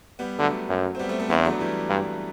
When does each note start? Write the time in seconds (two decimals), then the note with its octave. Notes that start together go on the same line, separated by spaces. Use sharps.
0.19 G3 B3
0.39 D3 F#3 A3
0.69 F#2
0.95 C4
0.99 G3 B3
1.09 A3 C4
1.19 A3 C4
1.29 E2 B3 D4
1.45 F#3 A3
1.59 E3 G3
1.89 G2